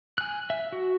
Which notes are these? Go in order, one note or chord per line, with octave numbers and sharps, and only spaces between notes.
G#5 F#6
E5
F#4